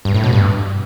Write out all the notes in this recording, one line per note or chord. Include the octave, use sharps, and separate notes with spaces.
G2
A2
B2
G2